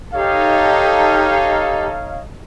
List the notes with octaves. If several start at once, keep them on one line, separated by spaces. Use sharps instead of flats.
D#4 G4 A4 C#5 D#5 F5